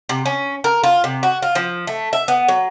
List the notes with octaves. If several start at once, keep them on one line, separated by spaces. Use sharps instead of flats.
C3
C#4
A#4
F4
C3
F#4
F4
F3
A3
E5
B3
F#3